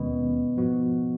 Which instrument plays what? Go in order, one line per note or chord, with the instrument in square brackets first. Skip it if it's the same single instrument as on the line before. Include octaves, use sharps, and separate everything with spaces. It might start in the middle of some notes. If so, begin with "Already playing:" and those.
Already playing: [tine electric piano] D#2 D#3 G#3 C#4 [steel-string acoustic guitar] B2
[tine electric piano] G#2 F3 B3 F#4